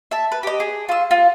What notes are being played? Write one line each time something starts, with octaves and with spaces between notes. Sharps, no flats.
E5 A5
B4
G4 D#5
G#4
F4 E6
F4